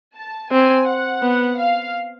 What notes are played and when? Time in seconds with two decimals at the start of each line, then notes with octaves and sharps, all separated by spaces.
0.15 A5
0.51 C4 G#5
0.86 F#5
1.22 B3
1.58 F5